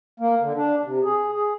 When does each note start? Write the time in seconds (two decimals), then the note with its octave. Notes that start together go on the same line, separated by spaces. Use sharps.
0.20 A#3
0.41 D3
0.56 D4
0.85 C3
1.04 G#4
1.33 G#4